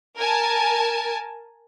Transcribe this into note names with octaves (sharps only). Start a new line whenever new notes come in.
A#4 G#5 A5